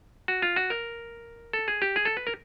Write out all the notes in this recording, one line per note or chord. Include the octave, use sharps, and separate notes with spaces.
F#4
F4
F#4
A#4
A4
G#4
G4
G#4
A4
B4
A#4